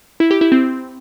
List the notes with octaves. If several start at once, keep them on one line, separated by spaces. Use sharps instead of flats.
E4
G4
E4
C4